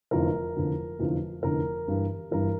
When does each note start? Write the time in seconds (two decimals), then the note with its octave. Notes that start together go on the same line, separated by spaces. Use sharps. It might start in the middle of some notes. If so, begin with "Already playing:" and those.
0.11 F1 E2 D3 F3 A#4
0.56 F1 E2 D3 F3
0.99 F1 E2 D3 F3
1.43 F1 E2 D3 F3 A#4
1.88 G1 G2 E3
2.31 G1 G2 E3 A#4